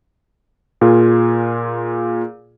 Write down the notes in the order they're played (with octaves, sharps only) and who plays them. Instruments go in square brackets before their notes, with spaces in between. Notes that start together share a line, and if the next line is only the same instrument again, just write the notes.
[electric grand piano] A#2 F4 G#4